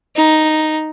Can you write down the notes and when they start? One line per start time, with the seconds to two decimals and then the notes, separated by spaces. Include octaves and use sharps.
0.16 D#4